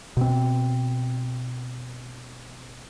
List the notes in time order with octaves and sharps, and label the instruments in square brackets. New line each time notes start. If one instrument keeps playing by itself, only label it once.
[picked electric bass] B2 C4